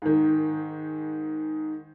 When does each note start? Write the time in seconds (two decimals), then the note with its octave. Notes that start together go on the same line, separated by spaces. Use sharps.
0.02 G#2 D#3